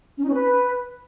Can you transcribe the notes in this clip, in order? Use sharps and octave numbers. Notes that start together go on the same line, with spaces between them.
C#4
D#4
C#4
B4